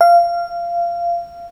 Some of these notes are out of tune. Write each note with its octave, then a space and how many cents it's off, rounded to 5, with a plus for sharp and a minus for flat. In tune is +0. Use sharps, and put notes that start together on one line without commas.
F5 -20